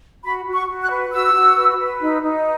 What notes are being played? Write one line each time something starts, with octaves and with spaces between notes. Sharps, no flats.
F#4 B5
F#4
C#6
F#4
F#6
B4
F#4 E6
F#4
B4
B4
D#4
D#4